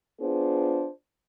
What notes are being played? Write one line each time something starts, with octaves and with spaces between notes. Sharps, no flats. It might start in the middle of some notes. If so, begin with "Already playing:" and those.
B3 D4 F4 G#4 C5